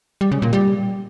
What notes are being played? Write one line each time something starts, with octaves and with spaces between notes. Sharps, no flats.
G3
C#3
A#2
G3